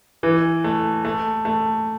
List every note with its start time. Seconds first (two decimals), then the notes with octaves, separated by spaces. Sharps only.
0.23 E3
0.64 A3
1.05 A3
1.45 A3